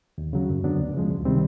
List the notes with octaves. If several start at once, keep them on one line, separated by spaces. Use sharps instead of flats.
D#2
C#3 F#3
F#2
D3 F#3 B3 D4
D2
C#3 F3 G#3
C#2
C3 D#3 G3 C4